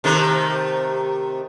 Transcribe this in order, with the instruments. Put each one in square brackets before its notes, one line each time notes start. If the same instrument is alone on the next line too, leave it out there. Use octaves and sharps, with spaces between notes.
[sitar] C3 D#3 A3